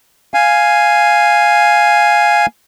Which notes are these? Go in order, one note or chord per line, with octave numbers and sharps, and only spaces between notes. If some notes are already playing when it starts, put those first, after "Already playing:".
F5 G#5